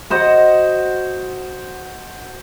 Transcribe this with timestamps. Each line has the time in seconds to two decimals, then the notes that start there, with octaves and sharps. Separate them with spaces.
0.10 F#4 C5 D#5 F#5